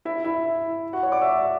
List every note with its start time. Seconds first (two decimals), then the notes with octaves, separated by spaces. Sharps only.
0.05 E4 E5
0.25 E4 E5
0.93 F#4 F#5
1.03 C#5 C#6
1.12 D5 D6
1.22 E5 E6